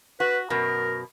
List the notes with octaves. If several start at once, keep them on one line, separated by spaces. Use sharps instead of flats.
F#4 B4
F#2 B2 A#4